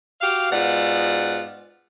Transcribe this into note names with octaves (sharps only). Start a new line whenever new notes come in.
F#4 G4 F5
G#2 B2 F4 D5 F#5